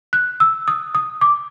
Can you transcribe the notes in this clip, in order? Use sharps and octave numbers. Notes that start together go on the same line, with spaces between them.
F#6
E6
D#6
D#6
D6